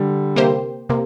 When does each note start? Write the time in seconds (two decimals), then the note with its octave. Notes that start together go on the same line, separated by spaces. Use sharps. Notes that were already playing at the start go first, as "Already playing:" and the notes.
Already playing: D3 G3
0.36 C3 A#3 G4 C5
0.89 C3 A#3